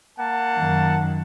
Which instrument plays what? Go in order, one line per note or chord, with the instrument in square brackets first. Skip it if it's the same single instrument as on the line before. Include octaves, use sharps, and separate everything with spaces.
[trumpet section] A#3 F#5 A5
[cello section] F#2 D#3